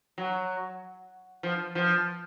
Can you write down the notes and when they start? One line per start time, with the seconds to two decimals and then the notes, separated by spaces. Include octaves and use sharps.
0.18 F#3
1.43 F3
1.75 F3